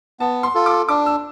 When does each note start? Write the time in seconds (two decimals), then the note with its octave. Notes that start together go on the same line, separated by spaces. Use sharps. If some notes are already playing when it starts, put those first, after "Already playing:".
0.20 B3 A5
0.43 C6
0.55 F4 A4
0.66 D6
0.89 D4 D6
1.06 E6